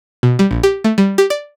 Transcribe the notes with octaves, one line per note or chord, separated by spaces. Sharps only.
B2
G3
A#1
G4
A3
G3
G4
D5